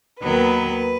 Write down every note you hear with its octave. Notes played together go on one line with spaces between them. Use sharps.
D#2 D#3 F#3 B3 B4